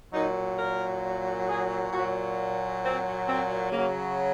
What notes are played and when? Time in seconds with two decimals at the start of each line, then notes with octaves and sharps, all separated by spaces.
0.13 A#2 F#3 D#4
0.58 A#4
1.48 G#4
1.92 A#2 F#3 F#4
2.83 C4
3.27 C4
3.72 C#3 F#3 A#3